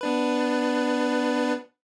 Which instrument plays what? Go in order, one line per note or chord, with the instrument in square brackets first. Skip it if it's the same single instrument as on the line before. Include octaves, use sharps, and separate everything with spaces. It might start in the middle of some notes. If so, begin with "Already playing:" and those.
[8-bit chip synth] B3 D4 B4